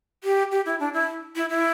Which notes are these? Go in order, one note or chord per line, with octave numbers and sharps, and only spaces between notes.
G4
G4
E4
D4
E4
E4
E4